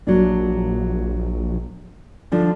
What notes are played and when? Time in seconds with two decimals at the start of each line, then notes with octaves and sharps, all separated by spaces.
0.07 A#1 F#3 A#3 D4
2.32 D3 F3 D4